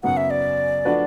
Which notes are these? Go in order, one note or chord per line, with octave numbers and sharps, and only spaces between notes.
F#2 C#3 F#3 B3 F#5
E5
D5
F3 A3 D4 F#4 B4